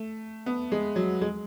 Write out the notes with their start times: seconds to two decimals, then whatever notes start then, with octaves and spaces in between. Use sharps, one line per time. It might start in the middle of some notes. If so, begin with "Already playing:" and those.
Already playing: A3
0.46 B3
0.72 G#3
0.96 F#3
1.21 G#3